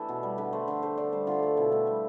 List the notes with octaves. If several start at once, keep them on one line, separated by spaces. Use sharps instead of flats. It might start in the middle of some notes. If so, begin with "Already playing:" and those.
Already playing: E3 A3 D4 E4 G4 A4
B2
G3
D3 B4
A3 C5
D3
A3 C5
D3 D5
G3 C5
D3 F4
A3
B2 E4
A3 D4
G3